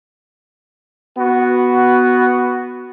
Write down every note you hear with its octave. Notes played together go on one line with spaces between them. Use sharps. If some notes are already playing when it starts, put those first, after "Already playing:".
B3 F#4